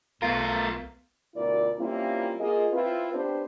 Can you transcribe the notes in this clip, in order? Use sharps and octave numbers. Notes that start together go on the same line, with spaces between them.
B1 A3 B3 F4 A#4
D2 B2 E4 F4 A#4 D5
G3 A#3 C4 C#4 E4 F4
A#3 F4 G#4 D#5
C4 E4 F4 B4
B3 C4 D4 G4 B4 C5